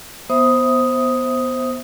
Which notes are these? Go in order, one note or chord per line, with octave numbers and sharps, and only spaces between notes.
B3 C5 E5 D#6